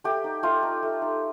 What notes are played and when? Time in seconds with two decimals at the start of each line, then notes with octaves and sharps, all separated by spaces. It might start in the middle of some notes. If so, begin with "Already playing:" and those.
0.04 A3 G4
0.24 D#4
0.43 A3 F4
0.63 D#4
0.83 A3
1.02 D#4